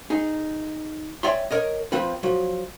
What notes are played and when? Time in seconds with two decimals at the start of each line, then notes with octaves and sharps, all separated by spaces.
0.10 D#4 G#4
1.23 C#5 D5 E5 G5 G#5 C6
1.51 A#4 C#5 D#5
1.92 F3 C4 B4
2.23 F3 F#3